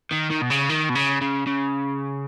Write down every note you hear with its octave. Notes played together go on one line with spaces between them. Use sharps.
D#3
D#3
B2
C#3
D#3
B2
C#3
C#3
C#3